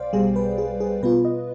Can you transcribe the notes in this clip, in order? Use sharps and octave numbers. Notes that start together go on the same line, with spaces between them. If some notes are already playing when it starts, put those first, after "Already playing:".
Already playing: B1 B2 C5 D5 F5 G5
B1 B2 G3 G#4
B4
G#4
G#4
B2 B3 F4 B4
D#5